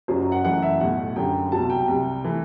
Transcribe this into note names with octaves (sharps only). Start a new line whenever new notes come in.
F#1 F#2 F#3 C5
F#5
F#2 E3 A3 F#5
E5
B1 A2 G3 F#5
F#2 D3 G3 G5
C2 B2 F#3 A5
G5
C2 C3 G3
E3 A3